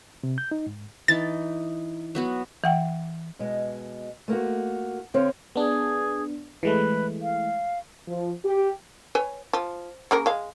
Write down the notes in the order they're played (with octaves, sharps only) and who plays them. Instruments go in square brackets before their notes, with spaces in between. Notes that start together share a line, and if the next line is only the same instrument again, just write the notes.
[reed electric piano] C3
G6
D#4
G#2
[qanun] E3 D#4 [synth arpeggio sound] A6
[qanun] F#3 B3 F#4
[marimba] E3 F#5 G5
[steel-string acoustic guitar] B2 G#3
A3 A#3 F4 F#4
D3 C4 C#5 F5
[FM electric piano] B3 D4 [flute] G#4
[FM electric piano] E3 G#3 A3 [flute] B4
[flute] F5
[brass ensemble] F3
G4
[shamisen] B4 C#5 G#5
F3
C#3 A#3 A#4
G#3 F5